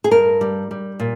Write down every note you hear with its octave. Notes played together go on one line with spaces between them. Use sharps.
G#4
G2 A#4
G3
G3
A#2